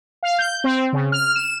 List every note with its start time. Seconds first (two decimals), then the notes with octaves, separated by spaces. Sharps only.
0.23 F5
0.38 G6
0.64 C4
0.93 C#3
1.12 F6
1.36 E7